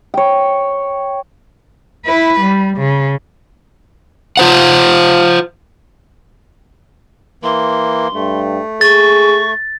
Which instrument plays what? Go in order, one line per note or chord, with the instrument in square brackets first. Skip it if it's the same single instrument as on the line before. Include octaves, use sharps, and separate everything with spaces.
[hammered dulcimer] C#5 G5
[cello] E4 B4
G3
C#3
[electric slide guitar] F4 C5 F#5
[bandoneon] E3 A#3 [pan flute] C6
[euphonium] G2 [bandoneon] A3
[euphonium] G#4 [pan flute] C#6 [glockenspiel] A6